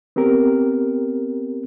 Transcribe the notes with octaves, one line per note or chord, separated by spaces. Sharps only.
B3 C4 G4 A#4